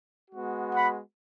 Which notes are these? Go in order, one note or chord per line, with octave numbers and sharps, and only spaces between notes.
G#3 B3 F#4
F#5 B5